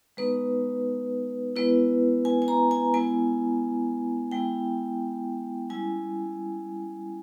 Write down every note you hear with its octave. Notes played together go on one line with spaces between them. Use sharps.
G#3 B3 D#4 B4
G#3 B3 E4 B4
G#5
G#5
A#5
G#5
G#3 B3 E4 G#5
G#3 B3 E4 G5
G3 C#4 E4 G#5